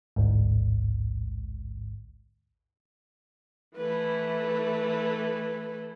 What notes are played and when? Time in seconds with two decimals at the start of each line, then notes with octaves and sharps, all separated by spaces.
0.16 A1 D2 G#2
3.77 E3 A3 B4